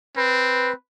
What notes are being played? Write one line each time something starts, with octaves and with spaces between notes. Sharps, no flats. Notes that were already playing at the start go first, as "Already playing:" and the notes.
C4 B4